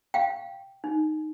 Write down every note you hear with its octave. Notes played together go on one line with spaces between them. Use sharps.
F5 G5
D#4